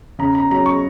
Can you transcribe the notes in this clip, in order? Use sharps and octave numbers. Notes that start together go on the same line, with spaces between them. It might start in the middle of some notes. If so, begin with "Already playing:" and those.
C#3 A#5
A#5
F#3 C#4 A#5
C#6